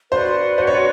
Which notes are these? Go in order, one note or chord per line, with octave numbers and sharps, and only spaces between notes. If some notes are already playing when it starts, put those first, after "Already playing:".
F#4 B4 C5 D5
C5
C#5